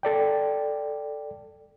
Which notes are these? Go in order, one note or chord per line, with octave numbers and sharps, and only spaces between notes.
A4 D5 G5